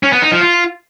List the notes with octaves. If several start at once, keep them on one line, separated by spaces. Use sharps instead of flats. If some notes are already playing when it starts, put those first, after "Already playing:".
C#4
B3
D#4
F3
F4